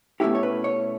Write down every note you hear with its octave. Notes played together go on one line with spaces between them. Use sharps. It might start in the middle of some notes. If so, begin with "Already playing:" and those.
B2 A3 C#4 E4 G4
C#5
B4
C#5